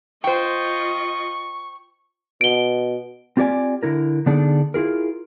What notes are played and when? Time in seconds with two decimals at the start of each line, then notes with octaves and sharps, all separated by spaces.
0.24 F4 C5 D#5 G5 C#6
2.41 B2 D7 G7
3.37 C4 F4 G4 C#5 D5 G#5
3.83 D3 E4 A#4
4.26 D3 B3 D4 D#4 G#4 A4
4.74 E4 F4 G#4 A#4